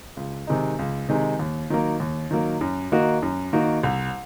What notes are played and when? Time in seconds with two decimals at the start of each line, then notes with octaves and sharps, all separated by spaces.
0.17 C#2
0.47 C3 D#3 G#3 D#4
0.79 C#2
1.09 C3 D#3 G#3 D#4
1.39 D#2
1.70 D#3 F#3 A#3
2.00 D#2
2.31 D#3 F#3 A#3
2.61 F#2
2.92 D#3 A#3 D#4 F#4
3.23 F#2
3.53 D#3 A#3 D#4 F#4
3.83 C2